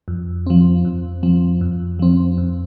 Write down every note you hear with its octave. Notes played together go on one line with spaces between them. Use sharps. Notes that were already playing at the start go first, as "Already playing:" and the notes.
F2
F3 C4
F2
F3 C4
F2
F3 C4
F2